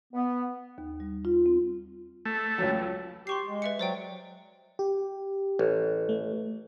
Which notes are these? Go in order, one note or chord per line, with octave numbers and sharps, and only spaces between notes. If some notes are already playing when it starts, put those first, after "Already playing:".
B3
D#2
G3
F4
C4
A3
C#2 F#3
G4 C6 C#6 C7
G#3
B4 E5 C#7
F#3 C5 D5 G5
G4
A1
A3